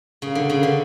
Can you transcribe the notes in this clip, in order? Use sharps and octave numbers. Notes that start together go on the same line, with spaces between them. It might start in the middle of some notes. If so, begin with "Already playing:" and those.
C#3
D3
C#3
D3